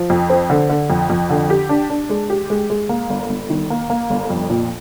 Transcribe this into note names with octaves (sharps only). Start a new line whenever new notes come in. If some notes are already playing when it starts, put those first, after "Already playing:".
Already playing: F3
F2
C4
D3
D3
F2
F2
D3
G4
D4
D4
G#3
G4
G#3
G#3
A#3
G1
G1
D#3
A#3
A#3
G1
F2
A#2